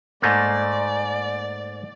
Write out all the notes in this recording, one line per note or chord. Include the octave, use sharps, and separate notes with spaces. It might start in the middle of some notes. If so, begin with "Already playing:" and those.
G#2 A3 A#3 D5